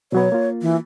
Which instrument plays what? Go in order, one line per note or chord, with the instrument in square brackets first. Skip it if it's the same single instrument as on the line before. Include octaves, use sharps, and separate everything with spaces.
[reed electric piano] B2 F#3 B3 [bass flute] C#5
[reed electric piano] A#3 F4
[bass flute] E3